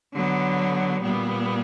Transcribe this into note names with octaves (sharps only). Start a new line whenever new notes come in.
D3 F#3 B3
A#2 G3 B3